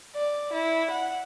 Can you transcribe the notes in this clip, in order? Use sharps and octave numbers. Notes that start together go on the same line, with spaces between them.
D5
E4
F#5